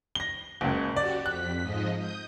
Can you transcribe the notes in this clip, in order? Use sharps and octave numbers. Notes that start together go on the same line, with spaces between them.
A#6 G7
F#1 C#2
F#4 G4 D5
F2 F#6 B6
G#2 F3 D#5
D#6 G6